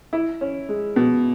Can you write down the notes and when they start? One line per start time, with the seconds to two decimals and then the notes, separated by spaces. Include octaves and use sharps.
0.13 E4
0.41 C#4
0.69 G#3
0.96 B2